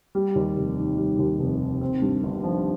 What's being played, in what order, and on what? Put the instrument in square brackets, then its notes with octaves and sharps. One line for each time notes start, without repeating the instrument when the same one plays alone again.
[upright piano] G3
D#2
F1
D#3
G3
D#2
F1
D#3
C4
G2
G1
F3